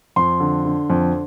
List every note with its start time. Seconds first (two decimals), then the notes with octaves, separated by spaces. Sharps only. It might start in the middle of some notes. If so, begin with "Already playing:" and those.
0.16 F2 C6
0.40 D3
0.65 D3
0.90 F2